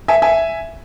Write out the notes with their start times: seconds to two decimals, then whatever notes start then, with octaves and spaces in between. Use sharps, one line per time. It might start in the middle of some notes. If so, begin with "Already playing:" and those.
0.08 E5 G#5
0.22 E5 G#5